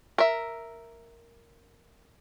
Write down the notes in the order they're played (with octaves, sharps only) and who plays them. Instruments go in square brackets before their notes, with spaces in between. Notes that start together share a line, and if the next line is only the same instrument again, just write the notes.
[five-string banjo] A#4 E5